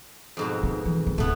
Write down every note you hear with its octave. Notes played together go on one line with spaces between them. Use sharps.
F2 G#2 B2
D#4
E3
D#3
D1 A3 B3 E4